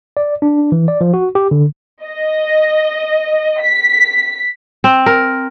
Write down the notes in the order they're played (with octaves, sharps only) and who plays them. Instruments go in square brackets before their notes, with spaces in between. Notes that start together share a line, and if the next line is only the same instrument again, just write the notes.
[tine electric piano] D5
D4
E3
D5
F3
F#4
G4
D3
[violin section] D#5
B6
[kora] C4
A#4